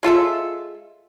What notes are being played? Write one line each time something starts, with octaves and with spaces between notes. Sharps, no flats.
G#3 F4 A4 E5